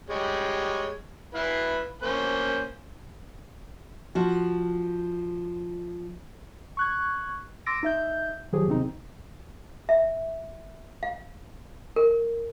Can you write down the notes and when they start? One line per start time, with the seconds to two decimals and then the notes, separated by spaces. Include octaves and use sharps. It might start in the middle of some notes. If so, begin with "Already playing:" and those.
0.10 G3 G#3 C#5
1.35 E4 B4 F5
2.02 A#3 C#4 C5
4.15 F3 F#4
6.77 C#6 F#6 G#6
7.66 C6 D6 E6 A6 A#6 D7
7.83 D#4 E5 G6
8.53 D#3 F3 F#3 G4 G#4
8.67 E2 C3 D#3 C4 D#4
9.89 E5
11.03 F5
11.96 A#4